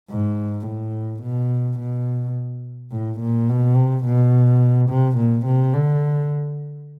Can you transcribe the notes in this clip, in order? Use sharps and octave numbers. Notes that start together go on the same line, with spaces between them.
G#2
A2
B2
B2
A2
A#2
B2
C3
B2
C3
A#2
C3
D3